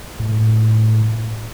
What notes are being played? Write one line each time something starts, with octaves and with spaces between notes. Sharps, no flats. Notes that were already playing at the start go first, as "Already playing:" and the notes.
A2